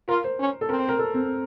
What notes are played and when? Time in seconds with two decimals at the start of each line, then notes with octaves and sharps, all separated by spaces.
0.08 F4 A#4
0.24 C5
0.39 C#4
0.61 A4
0.69 C4 A#4
0.79 C5
0.89 A#4
0.99 A4
1.14 C4